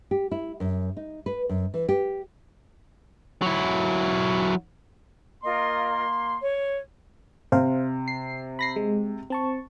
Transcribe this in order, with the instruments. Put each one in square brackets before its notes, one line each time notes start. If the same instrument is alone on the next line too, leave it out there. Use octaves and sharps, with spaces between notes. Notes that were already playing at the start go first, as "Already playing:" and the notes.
[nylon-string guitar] G4
E4
F#2
D#4
B4
F#2
E3
G4
[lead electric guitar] F#3 E4
[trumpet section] A#3 C6 [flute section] F4 A#4 D#5
[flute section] C#5
[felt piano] C3 [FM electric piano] C5 F5
[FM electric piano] C7
B5 A#6 C7
G#3
C4 A5 C#6